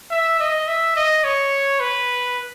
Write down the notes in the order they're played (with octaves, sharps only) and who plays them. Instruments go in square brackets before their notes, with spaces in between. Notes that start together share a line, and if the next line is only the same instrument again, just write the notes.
[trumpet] E5
D#5
E5
D#5
C#5
B4